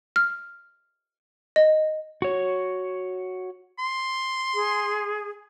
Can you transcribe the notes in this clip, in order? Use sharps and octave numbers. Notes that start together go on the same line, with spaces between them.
F6
D#5
F#4 C#5
C6
G#4